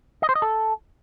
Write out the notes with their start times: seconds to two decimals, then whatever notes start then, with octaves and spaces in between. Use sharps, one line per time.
0.22 D#5
0.29 C5
0.35 D#5
0.42 A4